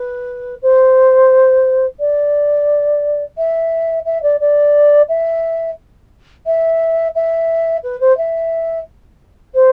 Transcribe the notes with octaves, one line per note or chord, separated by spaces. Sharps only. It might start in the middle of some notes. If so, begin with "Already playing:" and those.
Already playing: B4
C5
D5
E5
E5
D5
D5
E5
E5
E5
B4
C5
E5
C5